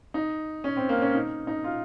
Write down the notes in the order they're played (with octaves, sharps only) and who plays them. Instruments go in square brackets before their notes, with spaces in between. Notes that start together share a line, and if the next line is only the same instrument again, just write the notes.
[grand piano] D#4
C#4
C4
A#3
C#4
D#4
D#4
F4